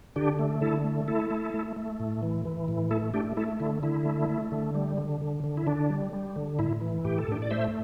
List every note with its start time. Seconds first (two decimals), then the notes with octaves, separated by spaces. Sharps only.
0.16 D3 D4 G4
0.39 A3
0.61 D3 E4 A4
0.85 A3
1.08 A3 E4 A4
1.31 A3
1.54 A3
1.76 A3
2.00 A2
2.23 E3
2.45 E3
2.68 A2
2.91 A3 E4 A4
3.14 A3 D4 G4
3.37 A3 E4 A4
3.60 D3 E4
3.83 D3 E4
4.05 A3
4.30 A3
4.52 D3
4.75 G3
4.98 D3
5.21 D3
5.44 D3
5.57 E4
5.67 D3 D4
5.90 G3
6.13 G3
6.36 D3
6.59 A2 E4
6.81 E3
7.05 A2 G4
7.18 A4
7.28 A2 D4 G4
7.42 D5
7.51 A3 C5 E5